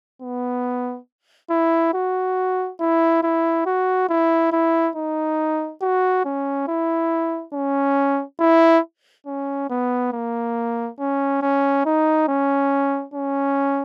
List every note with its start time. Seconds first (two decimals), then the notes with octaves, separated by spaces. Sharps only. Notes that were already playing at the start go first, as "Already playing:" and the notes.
0.22 B3
1.50 E4
1.94 F#4
2.80 E4
3.23 E4
3.66 F#4
4.09 E4
4.52 E4
4.96 D#4
5.82 F#4
6.25 C#4
6.68 E4
7.54 C#4
8.40 E4
9.27 C#4
9.70 B3
10.13 A#3
10.99 C#4
11.42 C#4
11.86 D#4
12.28 C#4
13.14 C#4